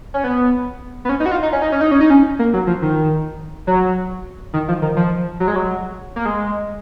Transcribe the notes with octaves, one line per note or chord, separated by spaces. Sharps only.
C#4
B3
B3
C#4
D#4
F#4
F4
D#4
C#4
D#4
C#4
D#4
C#4
D#4
C#4
A#3
F#3
F3
D#3
F#3
D#3
F3
D#3
F3
F#3
G#3
F#3
A#3
G#3